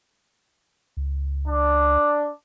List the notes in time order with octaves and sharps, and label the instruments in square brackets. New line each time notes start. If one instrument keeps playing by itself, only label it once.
[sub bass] C#2
[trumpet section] D4